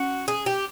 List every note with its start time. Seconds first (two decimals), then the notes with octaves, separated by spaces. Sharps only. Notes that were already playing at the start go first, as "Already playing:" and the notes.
Already playing: C#4 F#4
0.28 G#4
0.46 G4